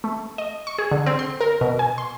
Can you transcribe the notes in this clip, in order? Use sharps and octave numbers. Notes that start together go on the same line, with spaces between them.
A3
D#5
C#6
G#4
D3
C4
C6
A#4
B2
G#5
C6